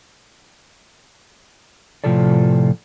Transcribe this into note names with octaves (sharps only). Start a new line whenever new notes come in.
A2 C3 F3 F4 A4 D5